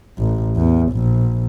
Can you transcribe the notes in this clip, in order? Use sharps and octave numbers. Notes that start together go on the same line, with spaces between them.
A1
E2
A#1